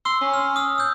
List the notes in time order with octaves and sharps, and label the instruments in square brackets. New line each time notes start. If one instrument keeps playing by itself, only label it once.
[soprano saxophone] C6 [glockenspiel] E6
[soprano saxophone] C#4
[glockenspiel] F6
D#6 F6
E6 G6